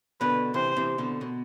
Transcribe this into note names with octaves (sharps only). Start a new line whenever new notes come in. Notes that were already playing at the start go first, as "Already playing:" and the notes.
B2 D3 B4
C3 E3 C5
C3 E3
B2 D3
B2